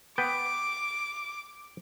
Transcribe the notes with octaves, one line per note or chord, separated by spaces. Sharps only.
B3 B4 G5 D6